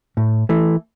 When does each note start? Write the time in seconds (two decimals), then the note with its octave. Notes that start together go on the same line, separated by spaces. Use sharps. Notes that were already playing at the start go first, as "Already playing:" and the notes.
0.17 A2
0.49 E3 A3